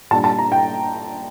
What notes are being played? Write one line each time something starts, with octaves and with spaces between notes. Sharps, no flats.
A#2 G3 D4 A5
A5
A#5
G5